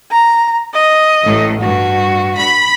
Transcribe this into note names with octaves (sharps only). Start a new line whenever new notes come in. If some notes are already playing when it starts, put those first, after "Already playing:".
A#5
D#5
A1 A2
G2 F#4
B5